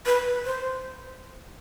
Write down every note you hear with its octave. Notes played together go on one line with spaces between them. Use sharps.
B4
C5